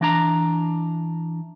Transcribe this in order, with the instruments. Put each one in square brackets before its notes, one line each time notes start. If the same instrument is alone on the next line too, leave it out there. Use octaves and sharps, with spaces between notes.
[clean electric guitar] E3 D4 A#5